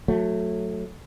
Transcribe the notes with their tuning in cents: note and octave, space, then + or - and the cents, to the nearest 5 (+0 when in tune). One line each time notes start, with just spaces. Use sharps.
F#3 -20 A3 +0